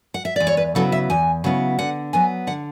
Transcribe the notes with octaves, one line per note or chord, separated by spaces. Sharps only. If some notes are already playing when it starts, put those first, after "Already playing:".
F#5
E5
E2 D5
C#5
B4
C#3 F#3 B3 E4 A4
E5
E2 G#5
C#3 F#3 B3 E4
D3 F#5
F#3 B3 G#5
D3 F#5